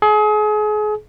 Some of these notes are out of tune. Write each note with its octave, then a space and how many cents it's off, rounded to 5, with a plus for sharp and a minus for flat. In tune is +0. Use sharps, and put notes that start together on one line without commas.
G#4 +35